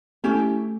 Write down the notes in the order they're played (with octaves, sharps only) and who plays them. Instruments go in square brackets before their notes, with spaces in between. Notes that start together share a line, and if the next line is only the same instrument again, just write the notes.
[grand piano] A3 [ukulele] C#4 E4 G4